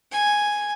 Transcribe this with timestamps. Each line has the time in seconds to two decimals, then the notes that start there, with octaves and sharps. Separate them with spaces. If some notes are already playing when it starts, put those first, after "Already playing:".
0.12 G#5